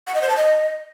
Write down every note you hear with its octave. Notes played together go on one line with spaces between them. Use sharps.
F#5
D#5
C5
A5
D#5